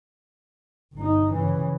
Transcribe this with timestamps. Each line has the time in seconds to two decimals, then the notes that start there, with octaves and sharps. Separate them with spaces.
0.94 G1 D#4
1.33 C#3 E3